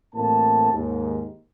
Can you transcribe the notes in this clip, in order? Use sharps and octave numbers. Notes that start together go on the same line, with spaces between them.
A1 A2 A#3 C4 A5
D#2 G#2